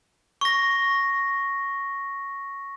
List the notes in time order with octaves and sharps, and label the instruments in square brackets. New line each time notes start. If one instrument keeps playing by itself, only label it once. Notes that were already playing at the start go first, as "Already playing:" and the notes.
[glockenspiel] C#6 A#6